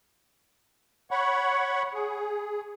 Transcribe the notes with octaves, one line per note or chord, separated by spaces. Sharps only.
C#5 F#5 B5 C#6
G#4